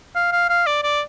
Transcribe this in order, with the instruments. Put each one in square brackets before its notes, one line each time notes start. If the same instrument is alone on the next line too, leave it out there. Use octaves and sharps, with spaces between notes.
[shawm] F5
F5
F5
D5
D5